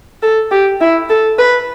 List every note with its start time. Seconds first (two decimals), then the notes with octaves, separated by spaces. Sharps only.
0.22 A4
0.51 G4
0.81 E4
1.09 A4
1.38 B4